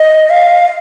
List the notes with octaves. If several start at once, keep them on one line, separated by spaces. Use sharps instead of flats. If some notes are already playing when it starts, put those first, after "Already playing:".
Already playing: D#5
F5